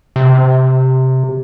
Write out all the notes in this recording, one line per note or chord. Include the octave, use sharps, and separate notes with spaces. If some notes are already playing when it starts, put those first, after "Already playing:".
C3